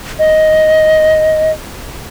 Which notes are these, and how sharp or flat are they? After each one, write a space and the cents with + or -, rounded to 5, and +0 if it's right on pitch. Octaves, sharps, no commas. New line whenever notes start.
D#5 +5